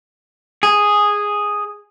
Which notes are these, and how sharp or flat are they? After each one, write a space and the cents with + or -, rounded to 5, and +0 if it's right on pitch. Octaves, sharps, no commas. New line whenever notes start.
G#4 -5